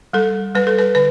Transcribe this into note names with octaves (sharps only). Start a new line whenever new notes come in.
G3 A4
G3 B4
A4
B4
D3 B4